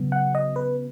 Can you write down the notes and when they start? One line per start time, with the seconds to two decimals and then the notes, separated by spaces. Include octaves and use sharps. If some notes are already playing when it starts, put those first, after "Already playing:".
Already playing: C#3 F#3 B3
0.12 F#5
0.35 D#5
0.56 B4